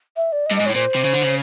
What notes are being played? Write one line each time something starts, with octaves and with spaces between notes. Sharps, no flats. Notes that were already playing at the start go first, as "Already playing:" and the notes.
E5
D5
D#5
G2
G#2 D#5
A2 C#5
A#2 C5
C3
C#3
D3
C#3